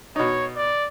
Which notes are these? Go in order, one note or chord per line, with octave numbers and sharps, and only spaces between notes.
B2 D#4 C#5
D5